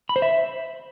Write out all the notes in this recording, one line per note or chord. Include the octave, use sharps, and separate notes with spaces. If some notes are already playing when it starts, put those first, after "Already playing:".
B5
C5
E5